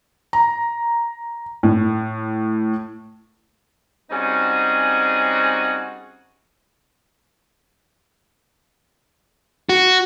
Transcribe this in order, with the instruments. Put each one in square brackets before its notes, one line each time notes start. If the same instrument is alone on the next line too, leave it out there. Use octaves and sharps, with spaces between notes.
[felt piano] A#5
A2
[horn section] G3 C4 C#4 D#4 F#4 G#4
[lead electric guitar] F#4